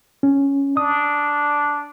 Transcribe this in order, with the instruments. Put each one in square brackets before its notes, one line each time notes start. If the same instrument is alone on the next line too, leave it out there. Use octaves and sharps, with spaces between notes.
[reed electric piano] C#4
[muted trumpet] D4 [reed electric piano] D#6